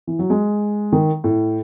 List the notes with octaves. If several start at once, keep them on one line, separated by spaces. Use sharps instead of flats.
E3
F#3
G#3
D#3
A2